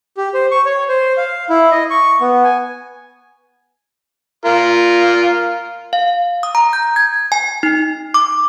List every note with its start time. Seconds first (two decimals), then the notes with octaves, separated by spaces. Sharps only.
0.17 G4
0.34 C5
0.52 C#6
0.66 C#5
0.89 C5
1.17 F5
1.50 E4
1.72 D#5
1.91 C#6
2.21 B3
2.44 G#5
4.45 F4 A#4
5.93 F5
6.43 D#6
6.55 A#5
6.73 G6
6.96 G#6
7.32 G#5
7.63 D#4
8.14 D6